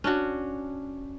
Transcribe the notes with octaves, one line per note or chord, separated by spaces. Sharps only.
C#4 D4 F#4